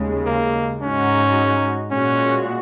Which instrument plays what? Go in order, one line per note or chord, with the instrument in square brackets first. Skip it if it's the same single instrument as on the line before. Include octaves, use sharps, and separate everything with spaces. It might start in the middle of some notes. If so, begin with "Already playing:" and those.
Already playing: [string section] D#2 C#3 G#3
[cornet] A#3
[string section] G#2 G#3 D#4 F#4 [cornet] C#4
[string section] A#2 G#3 F#4 [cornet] C#4